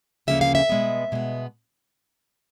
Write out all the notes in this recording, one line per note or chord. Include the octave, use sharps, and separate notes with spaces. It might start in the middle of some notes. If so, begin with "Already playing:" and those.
D2 C#3 F3 A#3 C#4 E5
F5
E5
B2 G#3 B3
B2 G#3 B3